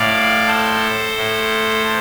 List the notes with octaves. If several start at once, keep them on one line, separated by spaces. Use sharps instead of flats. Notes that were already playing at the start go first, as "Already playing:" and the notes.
Already playing: A2 D5 F5
A4 C5
A2